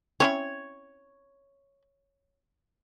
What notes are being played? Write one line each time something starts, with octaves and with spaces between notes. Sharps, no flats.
C4 C#4 E4 C#5